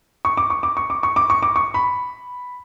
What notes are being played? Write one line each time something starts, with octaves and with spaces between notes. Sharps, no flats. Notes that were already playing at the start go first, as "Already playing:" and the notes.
C#6
D6
C#6
D6
C#6
D6
C#6
D6
C#6
D6
C#6
B5